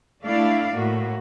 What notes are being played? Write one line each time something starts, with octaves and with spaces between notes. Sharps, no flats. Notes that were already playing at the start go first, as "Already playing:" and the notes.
A3 D4 E4 D5 F5
A2 A#3 F#4